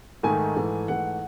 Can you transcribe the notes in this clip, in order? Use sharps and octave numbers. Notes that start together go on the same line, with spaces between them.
G#2 D#3 A3 G#5
G#2 E3 A3
G#2 E3 A3 F#5